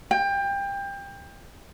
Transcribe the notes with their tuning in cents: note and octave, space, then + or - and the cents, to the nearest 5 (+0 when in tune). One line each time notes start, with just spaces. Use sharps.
G5 +25